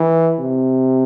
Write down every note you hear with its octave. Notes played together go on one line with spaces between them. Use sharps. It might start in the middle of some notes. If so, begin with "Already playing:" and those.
Already playing: E3
C3